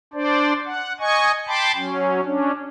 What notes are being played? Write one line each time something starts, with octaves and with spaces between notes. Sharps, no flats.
D4 C5 D5
F#5
D#5 G#5 C#6
G5 A5 B5 C6 D6
F#3 C#4
C#4 D4